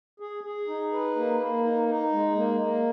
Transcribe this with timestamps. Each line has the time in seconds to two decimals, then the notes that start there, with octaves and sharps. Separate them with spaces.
0.20 G#4
0.44 G#4
0.68 D#4
0.92 B4
1.16 A#3
1.40 A#3
1.64 D#4
1.88 D#4
2.12 G#3
2.37 A#3
2.60 A#3